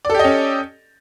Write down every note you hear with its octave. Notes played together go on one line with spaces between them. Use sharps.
C#4 G4 A4 D5 D#5